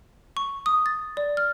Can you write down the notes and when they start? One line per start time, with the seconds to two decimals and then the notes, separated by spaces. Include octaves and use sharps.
0.37 C#6
0.66 D#6
0.86 A6
1.17 D5
1.37 F6